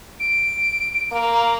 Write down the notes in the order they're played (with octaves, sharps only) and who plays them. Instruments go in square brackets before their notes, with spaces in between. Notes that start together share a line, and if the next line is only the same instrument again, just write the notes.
[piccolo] D7
[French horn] A#3 [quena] A#5